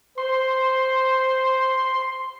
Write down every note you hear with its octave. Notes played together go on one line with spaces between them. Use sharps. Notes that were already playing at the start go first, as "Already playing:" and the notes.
C5 C6